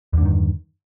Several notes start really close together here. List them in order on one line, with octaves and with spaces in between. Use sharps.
E2 D3 G2 D#3